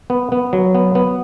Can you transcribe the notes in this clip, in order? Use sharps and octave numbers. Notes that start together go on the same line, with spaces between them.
B3
B3
F#3
B3
B3